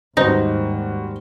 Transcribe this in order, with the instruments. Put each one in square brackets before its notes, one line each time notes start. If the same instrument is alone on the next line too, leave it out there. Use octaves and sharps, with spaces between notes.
[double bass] D#2 G#2 [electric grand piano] G3 F#4 [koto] D#4 [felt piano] C5